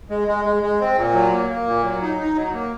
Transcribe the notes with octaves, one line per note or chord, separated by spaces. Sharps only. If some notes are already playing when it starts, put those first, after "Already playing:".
G#3
G#3
G#3
G#3
C4
A#2
F#3
A#3
A#3
A#2
F#3
D#4
D#4
F#3
A#3